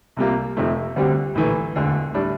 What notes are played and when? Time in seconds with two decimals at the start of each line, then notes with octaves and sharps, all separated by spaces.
0.17 C2 C3 G3 A#3 F4
0.57 F1 F2 C3 F3 A3
0.96 D2 D3 G3 C4 G4
1.35 A#1 A2 E3 A3
1.76 E1 D2 D3
2.14 A2 G3 D4